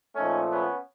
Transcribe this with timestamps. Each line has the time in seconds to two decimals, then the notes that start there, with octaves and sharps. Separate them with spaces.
0.15 A#2 F3 A3 C#4 D#4
0.51 B3 C#4